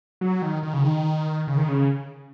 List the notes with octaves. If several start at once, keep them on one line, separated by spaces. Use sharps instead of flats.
F#3
D#3
D#3
C#3
D#3
C#3
D#3
C#3